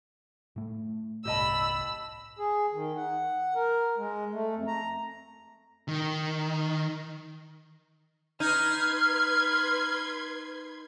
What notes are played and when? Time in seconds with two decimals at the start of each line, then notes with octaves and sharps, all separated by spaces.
0.56 A2 A3
1.25 G1 C2 A2 G4 D#5 A5 B5 E6
2.39 G#4
2.73 D#3
2.96 F#5
3.55 A#4
3.97 G#3
4.33 A3
4.56 F2
4.67 A#5
5.88 D#3
8.40 D#4 B4 C6 F6 G#6